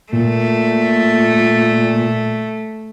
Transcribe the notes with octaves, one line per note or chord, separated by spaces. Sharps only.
A#2 A3